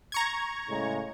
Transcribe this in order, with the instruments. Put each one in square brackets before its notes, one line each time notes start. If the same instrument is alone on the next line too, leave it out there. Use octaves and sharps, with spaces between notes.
[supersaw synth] A#5 C#6 G#6
[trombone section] A2 C#3 G#3